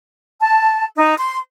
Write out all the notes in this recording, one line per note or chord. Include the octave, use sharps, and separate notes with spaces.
A5
D#4
C6